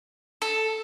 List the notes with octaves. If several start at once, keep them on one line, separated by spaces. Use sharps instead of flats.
A4